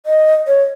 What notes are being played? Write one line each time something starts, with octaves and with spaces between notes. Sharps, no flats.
D#5
C#5